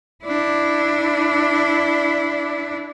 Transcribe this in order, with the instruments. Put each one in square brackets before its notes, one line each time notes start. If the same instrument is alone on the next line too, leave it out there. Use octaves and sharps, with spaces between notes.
[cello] D4 E4